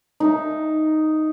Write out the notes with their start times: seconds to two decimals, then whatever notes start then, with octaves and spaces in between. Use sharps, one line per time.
0.20 D#4 E5